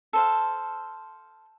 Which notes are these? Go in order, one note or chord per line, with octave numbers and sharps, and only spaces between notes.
A4 C5 F5